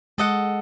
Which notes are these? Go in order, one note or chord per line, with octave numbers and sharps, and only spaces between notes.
G#3 A4 D#5 F#5